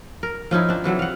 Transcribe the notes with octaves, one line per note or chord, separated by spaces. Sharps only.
A#4
F3 C#4 D#4 E4
C4 D4
C3 E3 F#3 A4
F5 F#5